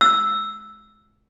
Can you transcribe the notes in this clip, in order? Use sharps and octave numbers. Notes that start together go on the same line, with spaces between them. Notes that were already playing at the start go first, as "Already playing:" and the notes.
E6